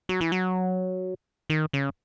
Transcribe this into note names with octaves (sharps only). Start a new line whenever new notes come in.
F#3
E3
F#3
D#3
C#3